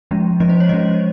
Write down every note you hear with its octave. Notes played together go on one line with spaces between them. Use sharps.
F3 G#3 C#4
F3 G#3 C#4 D#5
C5
C#5
F3 G#3 C#4 D#5